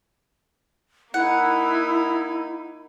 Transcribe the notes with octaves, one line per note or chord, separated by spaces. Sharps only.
A#3 D#4 E4 F#5